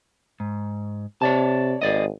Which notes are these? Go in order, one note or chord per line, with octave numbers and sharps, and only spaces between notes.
G#2
C3 C#5 D5 A5
G#1 G#4 D5 D#5